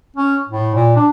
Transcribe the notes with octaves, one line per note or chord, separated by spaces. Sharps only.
C#4
A2
A#2
D4